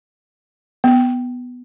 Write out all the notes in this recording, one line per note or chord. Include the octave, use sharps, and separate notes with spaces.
B3